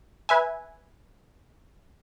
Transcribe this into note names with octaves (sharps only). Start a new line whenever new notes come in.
B4 E5 G#5